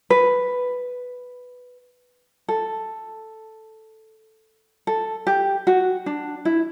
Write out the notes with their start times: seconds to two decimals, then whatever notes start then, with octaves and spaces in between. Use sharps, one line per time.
0.10 B4
2.48 A4
4.87 A4
5.27 G4
5.67 F#4
6.06 D4
6.45 E4